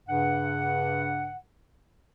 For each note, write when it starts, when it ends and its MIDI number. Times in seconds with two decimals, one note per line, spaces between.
0.07 1.37 43
0.07 1.37 49
0.07 1.37 78